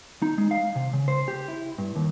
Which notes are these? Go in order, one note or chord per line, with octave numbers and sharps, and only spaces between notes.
D#4
G#3
F5
C3
C#3
C5
G4
E4
G2
D#2